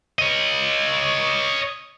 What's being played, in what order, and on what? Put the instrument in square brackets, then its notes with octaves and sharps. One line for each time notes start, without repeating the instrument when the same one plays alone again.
[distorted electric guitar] C#5 D#5